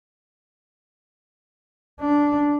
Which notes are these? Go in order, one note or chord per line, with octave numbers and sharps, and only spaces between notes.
D4